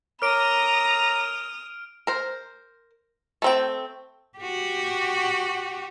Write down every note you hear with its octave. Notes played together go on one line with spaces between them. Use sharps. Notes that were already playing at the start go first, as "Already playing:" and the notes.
A#4 C#5 A#5 D6 D#6 F6 D7 F7
A#4 C5
A3 C4 G5
F#4 G4